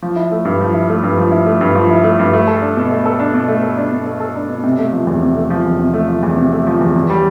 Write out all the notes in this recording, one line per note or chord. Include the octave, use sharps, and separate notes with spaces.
F3
E4
A3
G2
F3
E4
A3
G2
F3
E4
A3
G2
F3
E4
A3
G2
A3
A4
D4
B2
A3
A4
D4
B2
A3
A4
D4
B2
A3
A4
D4
B2
C3
A3
F3
E2
C3
A3
F3
E2
C3
A3
F3
E2
C3
A3
F3
E2
E2
G3